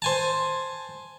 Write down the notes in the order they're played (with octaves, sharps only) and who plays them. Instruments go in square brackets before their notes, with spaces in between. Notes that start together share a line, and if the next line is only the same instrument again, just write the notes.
[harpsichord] C5 G#5 A5